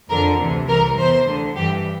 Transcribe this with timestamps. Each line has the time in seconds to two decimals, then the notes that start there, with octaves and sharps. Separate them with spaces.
0.10 F2 D3 A#4
0.40 D2 C3 E3
0.68 C2 C3 E3 A#4
0.97 E2 E3 C5
1.28 D2 D3
1.56 G2 E3 G4